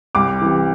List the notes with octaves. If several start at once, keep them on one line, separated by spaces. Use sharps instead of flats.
C2 D6
C3 E3